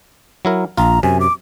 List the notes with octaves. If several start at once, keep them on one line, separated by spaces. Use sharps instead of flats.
F#3 E4 A#4
A#1 F4 A#5
F#2 C3 G#5
D6